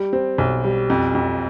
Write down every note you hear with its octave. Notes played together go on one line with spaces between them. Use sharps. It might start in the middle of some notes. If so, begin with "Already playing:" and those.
Already playing: G3
C4
B1
G3
F2
F2